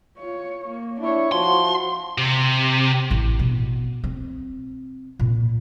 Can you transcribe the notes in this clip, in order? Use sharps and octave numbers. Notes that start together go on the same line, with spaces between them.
F4 C#5
A#3
D4 E4 C#5
F3 F#4 C6
C3
A1
B2
C4
A#2